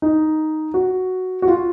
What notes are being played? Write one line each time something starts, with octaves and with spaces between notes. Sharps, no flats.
D#4
F#4
F#4
F4